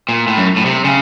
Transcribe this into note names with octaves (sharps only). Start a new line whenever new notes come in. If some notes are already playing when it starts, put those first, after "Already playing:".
A#2
A2
F#2
A2
C3
C#3